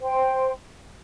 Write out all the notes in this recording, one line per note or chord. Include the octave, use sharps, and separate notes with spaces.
C5 G5 C6